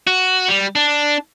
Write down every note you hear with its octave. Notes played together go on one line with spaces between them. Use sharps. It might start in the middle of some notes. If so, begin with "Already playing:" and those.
F#4
G3
D4